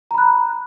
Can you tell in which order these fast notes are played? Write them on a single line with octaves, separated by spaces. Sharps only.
A#5 B5 F#6